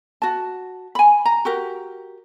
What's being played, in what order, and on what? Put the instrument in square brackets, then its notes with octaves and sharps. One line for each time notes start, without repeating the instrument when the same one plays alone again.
[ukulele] F#4 A5
G#5 B5
A#5
F#4 G4 A#4